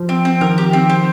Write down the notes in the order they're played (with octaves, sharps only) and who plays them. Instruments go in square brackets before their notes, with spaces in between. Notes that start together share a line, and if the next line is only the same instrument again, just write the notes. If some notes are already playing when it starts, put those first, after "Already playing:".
Already playing: [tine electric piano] F3
[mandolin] C4
C4
[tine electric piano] D#3 [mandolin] A#4
[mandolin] G4
C4
C4